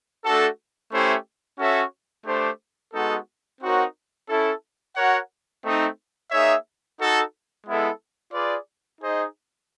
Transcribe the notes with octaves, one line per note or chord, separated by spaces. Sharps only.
A3 D4 F#4 A4
A3 C#4 E4 G4 C5
C#4 F#4 A4 C#5 E5
A3 D4 G4 C5
G#3 B3 D#4 F#4 A4
C4 D#4 F#4 A#4 C#5
C#4 E4 A4
F#4 A#4 C#5 F#5
A3 C4 D#4
A#3 D#4 G#4 C#5 E5
D#4 F#4 A4
G#3 B3 E4 A4
F4 G#4 B4 D5
D#4 G#4 C5 D#5